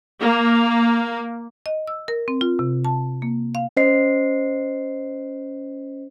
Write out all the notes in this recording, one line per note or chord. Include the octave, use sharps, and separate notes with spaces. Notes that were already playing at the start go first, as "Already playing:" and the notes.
A#3
D#5
E6
A#4
C4
F4
C3
A5
A#3
F5
C#4 C5 D#5 C7